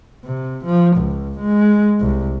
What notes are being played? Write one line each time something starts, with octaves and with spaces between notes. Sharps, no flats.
C3
F3
C#2
G#3
C2